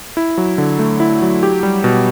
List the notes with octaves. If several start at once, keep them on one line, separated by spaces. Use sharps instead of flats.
E4
F#3
D3
A3
E4
F#3
G4
G3
B2